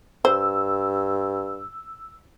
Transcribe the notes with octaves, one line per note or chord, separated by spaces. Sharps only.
G2 C5 E6